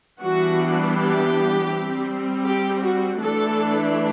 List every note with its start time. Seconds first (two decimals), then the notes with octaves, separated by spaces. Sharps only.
0.19 E3 G3 B3 D4 F#4
0.95 G4
1.70 G3 C4
2.44 G4
2.82 F#4
3.19 E3 A3 D4 A4